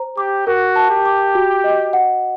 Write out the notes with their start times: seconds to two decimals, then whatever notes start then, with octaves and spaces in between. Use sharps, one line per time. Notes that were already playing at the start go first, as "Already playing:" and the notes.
Already playing: C5 A#5
0.18 G4 D6
0.47 F#4 A#4
0.76 A5
0.90 G4
1.06 D6
1.35 F#4
1.64 D#5
1.93 F#5